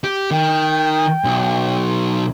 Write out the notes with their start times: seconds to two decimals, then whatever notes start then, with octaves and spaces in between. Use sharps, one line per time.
0.04 G4
0.31 D#3 G5
1.24 B1